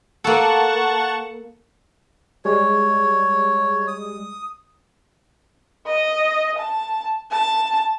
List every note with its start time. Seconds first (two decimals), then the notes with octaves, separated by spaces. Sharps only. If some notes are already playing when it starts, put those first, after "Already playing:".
0.24 A#3 A4 F#5 A5 C#6
2.45 G3 G#3 C#5
3.87 D#6
5.87 D#5
6.58 A5
7.31 A5